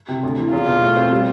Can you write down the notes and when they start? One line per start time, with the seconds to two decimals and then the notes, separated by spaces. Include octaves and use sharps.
0.08 C3
0.23 D2
0.38 E3
0.53 E2 F4
0.67 B2
0.82 A3
0.96 C4
1.11 G3